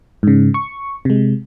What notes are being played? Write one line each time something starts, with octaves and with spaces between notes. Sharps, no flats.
G#2 C#3
C#6
C3 G#3